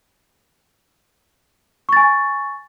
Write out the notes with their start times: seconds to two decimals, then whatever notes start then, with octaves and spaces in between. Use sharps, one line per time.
1.89 C#6
1.93 A6
1.96 G#5